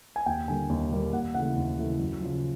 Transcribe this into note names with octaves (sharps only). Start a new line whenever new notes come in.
G#5
D#2 G5
D3 G3 A#3 G#5
D#2
D3 G3 A#3
D#2 F#5
C#3 E3 A3 F#5
D#2
C#3 E3 A3
F#2
C#3 F3